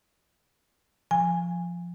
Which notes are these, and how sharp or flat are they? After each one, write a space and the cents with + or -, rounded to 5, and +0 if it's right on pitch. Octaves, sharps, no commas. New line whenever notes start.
F3 +0 G#5 -15